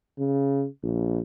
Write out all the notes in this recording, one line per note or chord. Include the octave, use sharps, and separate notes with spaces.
C#3
A#1